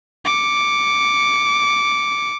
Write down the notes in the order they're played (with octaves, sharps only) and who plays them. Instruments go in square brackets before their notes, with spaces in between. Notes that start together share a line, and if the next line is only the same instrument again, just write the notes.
[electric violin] D6 C#7